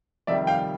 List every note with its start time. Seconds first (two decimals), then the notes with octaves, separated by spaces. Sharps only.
0.27 F2 C3 D#3 G3 D5 E5
0.47 F5 G5